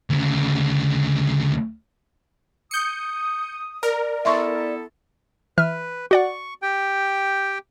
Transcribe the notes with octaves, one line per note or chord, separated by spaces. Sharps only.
D2 C#3
D#6 G6 C#7
A#4 D5
B3 E4 A4 E5 C6 C#6
E3 B4 E5 F6
F#4 D5 F#5 C#6
G4 G5